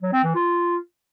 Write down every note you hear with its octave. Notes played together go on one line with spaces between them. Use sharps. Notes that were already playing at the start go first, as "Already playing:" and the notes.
F#3
C4
E3
F4